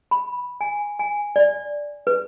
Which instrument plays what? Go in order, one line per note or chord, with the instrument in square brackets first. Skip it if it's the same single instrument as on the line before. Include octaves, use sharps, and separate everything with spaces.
[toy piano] B5
G#5
G#5
D5
B4